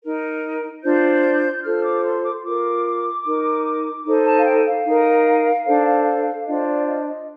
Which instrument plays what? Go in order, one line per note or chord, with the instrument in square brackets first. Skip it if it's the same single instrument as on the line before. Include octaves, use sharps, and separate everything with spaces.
[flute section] D#4 A#4
D4 F4 C5 G6
F4 A4 C5 F6
D6
C6
D6
C6
F4 A#4 D6
D#4 A#4
D#4 A4 C5
A5
F5
G5
F5
D#4 A#4
D4 A4 C5
D4 F4 C5 D#5
D5
D#5
D#5